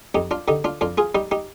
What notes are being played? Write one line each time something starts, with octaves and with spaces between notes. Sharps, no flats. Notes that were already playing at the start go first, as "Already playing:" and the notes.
F2 D#4 G4
D4 F4
D3 D#4 G4
D4 F4
F2 D4 F4
F4 G#4
G3 D#4 G4
D#4 G4